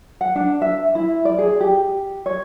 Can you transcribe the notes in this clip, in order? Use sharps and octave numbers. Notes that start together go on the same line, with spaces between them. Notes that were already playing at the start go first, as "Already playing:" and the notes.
F#5
D4
E5
E4
D5
G#4
G4
C#5